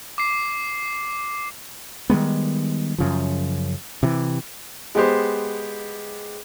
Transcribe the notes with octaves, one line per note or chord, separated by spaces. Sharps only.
D6 C7
D#3 G3 G#3 B3
F#2 C#3 F3
C3 E3
G#3 B3 G4 C5